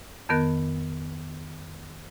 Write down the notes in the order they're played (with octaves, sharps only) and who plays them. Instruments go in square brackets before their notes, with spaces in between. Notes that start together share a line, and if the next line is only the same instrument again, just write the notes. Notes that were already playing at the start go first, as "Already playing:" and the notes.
[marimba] F2 D#3 B3 A#4 F#6